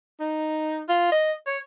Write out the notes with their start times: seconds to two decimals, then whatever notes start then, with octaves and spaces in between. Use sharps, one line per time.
0.20 D#4
0.89 F4
1.12 D#5
1.47 C#5